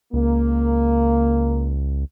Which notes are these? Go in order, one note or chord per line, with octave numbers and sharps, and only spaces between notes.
C#2 A#3